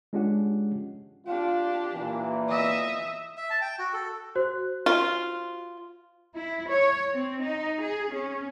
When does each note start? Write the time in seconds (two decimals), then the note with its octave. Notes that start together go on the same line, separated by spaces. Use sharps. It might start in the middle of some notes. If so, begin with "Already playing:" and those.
0.13 G#3 C#4 D4 F4 G4 F#5
1.27 D4 F4 G4
1.94 A#2 E3
2.49 D#5 E5
3.37 E5
3.50 A5
3.61 G5
3.79 F#4
3.93 A4
4.35 F#4 C5 F#6
4.86 F4
6.36 E4
6.70 C#5
7.13 C4
7.42 D#4
7.82 G#4
8.13 C#4